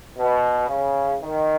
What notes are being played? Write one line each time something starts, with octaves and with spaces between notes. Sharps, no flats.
B2
C#3
D#3